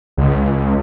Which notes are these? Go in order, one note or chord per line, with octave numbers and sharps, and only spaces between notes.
C#2